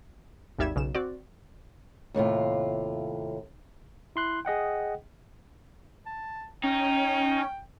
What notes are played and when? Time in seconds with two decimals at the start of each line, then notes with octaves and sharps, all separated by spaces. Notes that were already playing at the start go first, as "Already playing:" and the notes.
0.58 G#1 D#2 G3 E5 G#6 E7
0.76 B1 C#3 E7
0.95 C4 F#4 D5
2.14 D#2 A2 C3 F4
4.16 E4 C6 F#6
4.45 G#4 D#5 F#5 G5
6.06 A5
6.63 C#4 D#4 G5